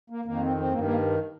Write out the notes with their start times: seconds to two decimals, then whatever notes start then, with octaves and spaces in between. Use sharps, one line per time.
0.10 A#3
0.25 F2 D#3 A#3
0.41 C4
0.57 C4
0.72 G2 D#3 A#3
0.83 A#3